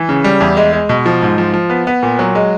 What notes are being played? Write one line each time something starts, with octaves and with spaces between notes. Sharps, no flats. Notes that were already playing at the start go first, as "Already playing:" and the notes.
Already playing: E3
C#3
G3
E2
G#3
G#3
B2
F3
G#2
F3
F3
B3
B3
A#2
F#3
G#3